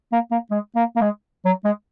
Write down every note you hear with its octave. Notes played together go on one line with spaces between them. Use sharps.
A#3
A#3
G#3
A#3
A#3
G#3
F#3
G#3